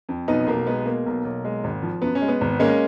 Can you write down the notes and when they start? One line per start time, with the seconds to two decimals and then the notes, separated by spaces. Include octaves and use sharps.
0.09 F2
0.28 B1 B3 D#4
0.47 B1 A#3
0.67 G#3 B3
0.86 B2 A#3
1.06 B1
1.25 B1
1.45 G#3
1.64 G#1
1.83 F3
2.02 F#2 B3
2.15 C#4
2.22 G#3
2.28 B3
2.41 G#1
2.60 G#3 A#3 C#4